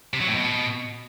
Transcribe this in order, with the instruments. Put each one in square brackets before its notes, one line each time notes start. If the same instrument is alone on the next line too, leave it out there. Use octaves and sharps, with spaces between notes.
[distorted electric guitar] C3
F#3
A2
B2